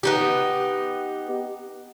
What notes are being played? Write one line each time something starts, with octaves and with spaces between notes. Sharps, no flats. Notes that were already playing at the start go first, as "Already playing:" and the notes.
B3 D#4 G4